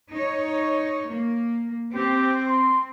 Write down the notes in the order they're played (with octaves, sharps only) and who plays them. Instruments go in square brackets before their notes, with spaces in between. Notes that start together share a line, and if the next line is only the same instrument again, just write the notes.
[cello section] D#4 C#5
A#3
[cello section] C4 [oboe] G4
[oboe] C6